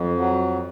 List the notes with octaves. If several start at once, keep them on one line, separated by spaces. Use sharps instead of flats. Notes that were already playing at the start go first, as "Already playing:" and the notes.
Already playing: F2
F#3